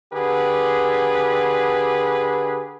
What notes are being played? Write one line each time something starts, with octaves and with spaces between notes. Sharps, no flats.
D3 G4 G#4 B4